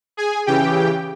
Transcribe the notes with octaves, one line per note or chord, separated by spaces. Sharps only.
G#4 G#5
C#3 E3 G4 G5